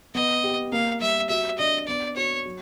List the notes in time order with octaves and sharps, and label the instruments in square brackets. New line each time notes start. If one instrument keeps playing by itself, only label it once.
[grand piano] B3 [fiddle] D#5
[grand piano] G4
[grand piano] A#3 [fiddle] F5
[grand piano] G3 [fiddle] E5
[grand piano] F#4 [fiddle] E5
[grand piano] D4 [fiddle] D#5
[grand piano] B3 [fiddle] D5
[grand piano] F#4 [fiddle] C#5
[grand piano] F#3